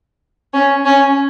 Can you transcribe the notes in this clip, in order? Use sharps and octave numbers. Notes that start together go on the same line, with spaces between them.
C#4
C#4